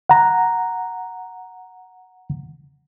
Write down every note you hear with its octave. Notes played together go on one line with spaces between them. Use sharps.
F#5 A#5